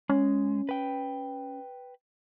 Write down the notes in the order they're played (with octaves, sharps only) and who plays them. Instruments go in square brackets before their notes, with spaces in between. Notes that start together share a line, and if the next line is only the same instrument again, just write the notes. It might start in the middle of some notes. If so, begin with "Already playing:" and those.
[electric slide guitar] G#3 [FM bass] C#4
[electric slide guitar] B4 G5